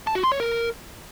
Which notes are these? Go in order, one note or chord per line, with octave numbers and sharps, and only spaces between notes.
A5
F#4
C6
C#5
A#4